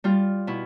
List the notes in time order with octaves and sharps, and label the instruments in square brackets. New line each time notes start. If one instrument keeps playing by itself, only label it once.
[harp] G3 F4
B2 E4